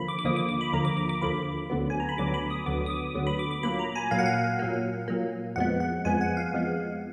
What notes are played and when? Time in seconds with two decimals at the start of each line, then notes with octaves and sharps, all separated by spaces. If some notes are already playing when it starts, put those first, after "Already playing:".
Already playing: D#2 D3 F3 A#3 B5
0.08 D6
0.19 D6
0.24 D#2 D3 F3 A#3 D#6
0.36 D6
0.49 D6
0.61 B5
0.72 D#2 D3 F3 A#3 A#5
0.85 D6
0.97 D6
1.09 D6
1.21 D#2 D3 F3 A#3 B5
1.70 D2 D3 F#3 B3
1.90 G#5
2.00 A#5
2.09 B5
2.18 D2 D3 F#3 B3 D6
2.34 B5
2.50 D#6
2.66 D2 D3 F#3 B3 D6
2.86 D#6
2.90 D6
3.15 D2 D3 F#3 B3
3.27 B5
3.39 D6
3.51 D6
3.63 A#2 F#3 A#3 B5
3.79 A#5
3.95 G#5
4.11 A#2 F#3 A#3 F5
4.19 F#5
4.26 F5
4.59 A#2 F#3 A#3
5.08 A#2 F#3 A#3
5.56 F2 F3 G#3 B3 F#5
5.80 F#5
6.05 F2 F3 G#3 B3 G#5
6.21 F#5
6.37 F5
6.53 F2 F3 G#3 B3